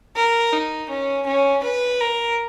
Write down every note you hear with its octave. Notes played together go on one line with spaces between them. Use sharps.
A#4
D#4
C#4
C#4
B4
A#4